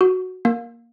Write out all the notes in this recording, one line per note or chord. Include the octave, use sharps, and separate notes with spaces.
F#4
A#3